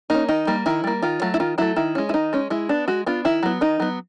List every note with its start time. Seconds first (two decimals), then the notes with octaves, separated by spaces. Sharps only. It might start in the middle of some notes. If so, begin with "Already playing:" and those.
0.10 A#3 C#4 D#4
0.29 D#3 D#4
0.47 G3 A#3
0.66 D#3 E4
0.84 G3 A#3
1.02 D#3 F4
1.22 F#3 A3
1.34 E4
1.40 D#3 F4
1.58 F#3 A3 E4
1.76 D#3 E4
1.95 G#3 C#4
2.09 E4
2.14 D#3 D#4
2.33 G#3 C#4
2.50 G#3 E4
2.69 B3 D4
2.88 G#3 F#4
3.06 B3 D4 F4
3.25 D#3 E4
3.43 F#3 B3
3.61 D#3 D#4
3.80 F#3 B3